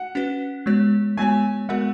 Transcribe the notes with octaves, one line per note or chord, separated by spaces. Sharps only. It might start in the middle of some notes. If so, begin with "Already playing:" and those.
Already playing: F#4 F#5
C#4 F#4 B4
G#3 B3 F#4 C#5
G#3 B3 F#4 C#5 G#5
G#3 B3 F#4 A#4 F#5